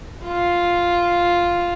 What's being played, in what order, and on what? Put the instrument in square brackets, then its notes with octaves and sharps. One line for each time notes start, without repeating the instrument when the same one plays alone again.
[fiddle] F4